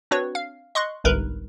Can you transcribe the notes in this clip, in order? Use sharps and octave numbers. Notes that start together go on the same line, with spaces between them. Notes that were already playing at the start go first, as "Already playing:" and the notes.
C4 D4 F#4 B4 C#5
F5
D#5 C6 C#6 F#6
G1 C2 G#2 A#4 B4